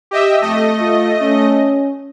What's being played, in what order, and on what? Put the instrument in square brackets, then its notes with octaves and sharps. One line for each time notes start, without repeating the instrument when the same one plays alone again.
[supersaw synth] G4 D#5 E5
[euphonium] F2 [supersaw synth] A3 D#5
[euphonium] F4
C#4